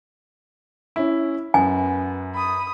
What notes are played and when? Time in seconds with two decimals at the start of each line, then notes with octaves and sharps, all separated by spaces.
0.96 C#4 E4
1.54 F#2 B3 G#5
2.35 B5 D#6